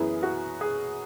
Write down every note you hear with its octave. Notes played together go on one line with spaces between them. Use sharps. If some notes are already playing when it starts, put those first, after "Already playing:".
Already playing: F#2 E3 B3 E4 G#4
F#4
G#4